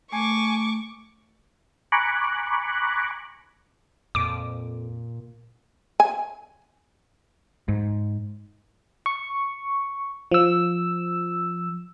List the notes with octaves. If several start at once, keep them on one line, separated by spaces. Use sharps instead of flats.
A3 G#5 C#6 D6
G#5 A#5 B5 C#6 D6 F#6
F2 A#2 D6 D7
G#5
G#2
C#6
F3 E6